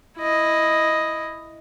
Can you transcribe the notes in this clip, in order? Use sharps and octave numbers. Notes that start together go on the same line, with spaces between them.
E4 D#5